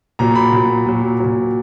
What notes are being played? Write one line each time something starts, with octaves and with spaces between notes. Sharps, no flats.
A#2 F#3 A#5
B5
A#2 F#3
A#2 F#3
A#2 F#3